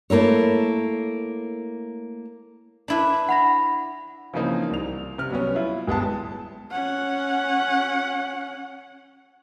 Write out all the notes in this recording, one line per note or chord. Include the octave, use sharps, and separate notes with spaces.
A3 A#3 E4 C#5
D4 E4 B4
F#5 B5 A#6
C#3 E3 F3 A#3 C4 D#4
C2 F7
C3 F6
F#3 G3 B3 C#4
E4 F4
G1 G#3 B3 A5
C#4 F#5